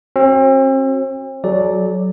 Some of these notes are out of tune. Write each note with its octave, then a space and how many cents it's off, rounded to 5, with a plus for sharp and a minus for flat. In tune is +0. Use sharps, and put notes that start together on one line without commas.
C4 +40 F#4 +0
F#3 +0 A4 -45 D5 +0